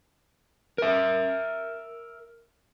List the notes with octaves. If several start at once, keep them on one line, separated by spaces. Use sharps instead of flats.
A#4 E5